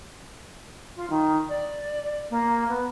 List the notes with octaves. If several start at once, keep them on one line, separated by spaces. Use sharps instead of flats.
F4
D#3
D5
A#3
B3